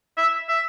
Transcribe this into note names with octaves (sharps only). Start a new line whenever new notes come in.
E5
E5